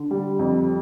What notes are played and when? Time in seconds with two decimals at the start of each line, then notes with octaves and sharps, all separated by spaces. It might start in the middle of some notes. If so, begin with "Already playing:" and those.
Already playing: D3
0.11 G3
0.39 F2